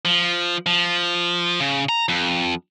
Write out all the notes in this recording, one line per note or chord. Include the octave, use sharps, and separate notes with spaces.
F3
F3
C#3
A#5
F2